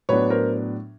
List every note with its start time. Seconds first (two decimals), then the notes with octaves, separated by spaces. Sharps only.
0.09 A2 F#3 B3 D4 B4 C#5
0.30 A#4 C5